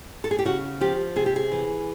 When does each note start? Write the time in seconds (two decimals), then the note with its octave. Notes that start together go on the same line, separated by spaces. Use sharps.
0.24 A4
0.31 G#4
0.39 G4
0.45 C#3 F#4
0.81 F3 G4
1.16 C3 G#4
1.26 G4
1.36 G#4
1.52 E3